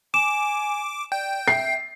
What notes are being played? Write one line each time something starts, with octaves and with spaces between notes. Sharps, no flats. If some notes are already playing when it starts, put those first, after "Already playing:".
G#5 D6 E7
D5 G5
E5 C7